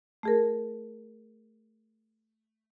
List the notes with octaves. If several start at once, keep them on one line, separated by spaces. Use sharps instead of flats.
A3 G#4 A#4